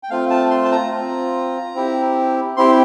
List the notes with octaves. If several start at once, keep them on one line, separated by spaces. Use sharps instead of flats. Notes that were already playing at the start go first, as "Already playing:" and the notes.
G5
A3 C4 F4 F5
A5
C6
A5
A#5
C4 F4
C4 E4 G4
C4 E4 G4 C6